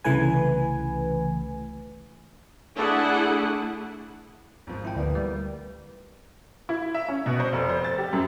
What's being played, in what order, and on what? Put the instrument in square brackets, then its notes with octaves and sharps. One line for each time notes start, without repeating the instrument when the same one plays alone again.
[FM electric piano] C2 C#3 E3 A3 B4 G#5
[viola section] A3 D4 E4 G#4 F#5
[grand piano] G#1 F3
[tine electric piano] E4 G5
[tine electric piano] D2 [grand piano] E3 A#3 B3
[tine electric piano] G3
[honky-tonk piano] E4
E5
C#4
B2
C5
F1
C5
A6
G4
F#2